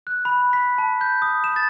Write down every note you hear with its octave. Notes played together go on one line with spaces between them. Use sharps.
F#6
B5
B6
A5
G6
D#6
E7
A6